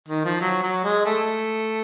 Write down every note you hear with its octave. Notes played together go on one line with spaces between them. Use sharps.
D#3
F3
F#3
F#3
G#3
A3